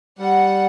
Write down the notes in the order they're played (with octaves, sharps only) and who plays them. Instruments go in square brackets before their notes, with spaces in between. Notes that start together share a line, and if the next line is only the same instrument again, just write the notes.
[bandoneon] G3 [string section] F#5